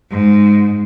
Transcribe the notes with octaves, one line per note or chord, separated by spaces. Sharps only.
G#2